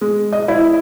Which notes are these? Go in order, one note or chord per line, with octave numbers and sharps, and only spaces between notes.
G#3
D#5
E4